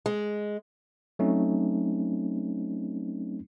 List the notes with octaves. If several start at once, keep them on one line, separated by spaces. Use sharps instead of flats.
G#3
F#3 A3 C4 C#4 D#4